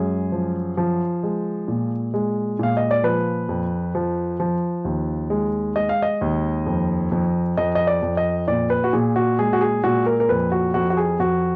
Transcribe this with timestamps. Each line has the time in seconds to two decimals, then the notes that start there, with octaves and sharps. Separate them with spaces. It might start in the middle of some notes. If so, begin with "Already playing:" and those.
Already playing: F#2 G#3 G#4
0.32 F3
0.77 F3
1.23 G#3
1.68 A#2
2.14 G#3
2.59 A#2 F5
2.77 D#5
2.91 D5
3.03 F3 B4
3.49 F2
3.95 F3
4.40 F3
4.85 D#2
5.30 G#3
5.76 G#3 D#5
5.89 F5
6.02 D#5
6.21 D#2
6.66 F2
7.12 F2
7.57 F2 D#5
7.75 D#5
7.87 D5
8.02 F2
8.17 D#5
8.48 A#2 D5
8.70 B4
8.84 F#4
8.93 A#2 G#4
9.16 F#4
9.39 G#3 G#4
9.53 F#4
9.61 G#4
9.84 A#2 F#4
10.06 A#4
10.20 A#4
10.29 F2 B4
10.52 F#4
10.74 F2 F#4
10.90 F#4
10.97 G#4
11.19 F2 F#4